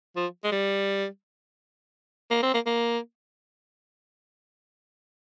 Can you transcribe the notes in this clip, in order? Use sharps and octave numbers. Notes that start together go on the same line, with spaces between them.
F3
G#3
G3
A#3
C4
A#3
A#3